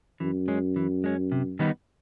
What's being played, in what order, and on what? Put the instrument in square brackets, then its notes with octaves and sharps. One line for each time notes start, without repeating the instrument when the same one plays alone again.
[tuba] F#2 [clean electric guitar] E3
[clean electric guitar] G#3 C#4
E3
G#3 C#4
C3
D#3 G3 B3 D#4